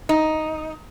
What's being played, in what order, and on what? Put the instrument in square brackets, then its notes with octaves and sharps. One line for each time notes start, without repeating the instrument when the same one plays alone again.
[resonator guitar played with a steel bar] D#4